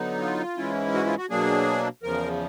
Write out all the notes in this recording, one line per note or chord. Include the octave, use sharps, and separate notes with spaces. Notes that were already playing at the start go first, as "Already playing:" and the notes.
Already playing: D3 F#3 B3 D#4
F4
G#2 E3 G#3 C#4 E4
F#4
F4
F#4
B2 F#3 A#3 D4 G#4
E2 C#3 F3 A#4